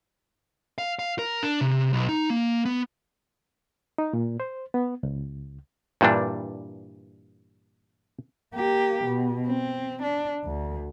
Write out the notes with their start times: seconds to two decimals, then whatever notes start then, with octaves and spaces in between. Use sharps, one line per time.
0.78 F5
0.99 F5
1.19 A#4
1.43 D4
1.61 C3
1.93 B1
2.09 D#4
2.30 A#3
2.65 B3
3.98 D#4
4.13 A#2
4.40 C5
4.74 B3
5.03 C#2
6.01 G2 A#2 E3 G3 D4
8.55 A#3 G4
9.05 B2
9.46 C4
10.03 D4
10.45 D2